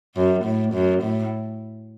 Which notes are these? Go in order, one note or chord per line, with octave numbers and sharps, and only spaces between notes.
F#2
A2
F#2
A2